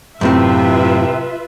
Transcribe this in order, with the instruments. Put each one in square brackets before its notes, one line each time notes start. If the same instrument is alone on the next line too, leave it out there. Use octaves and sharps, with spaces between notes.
[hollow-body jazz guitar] F#2 A2 C4 [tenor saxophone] C3 [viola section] F4 B4 E5